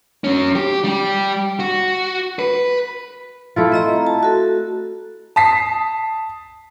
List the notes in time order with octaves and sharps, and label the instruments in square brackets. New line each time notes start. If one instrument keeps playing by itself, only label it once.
[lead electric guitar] F#3 C#4
G4
G3 G4
F#4
B4
[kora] A3 E4 F4
[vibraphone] C4 D#5 A#5
A5
F#4 A4
[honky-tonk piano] A5 D#6 B6 C7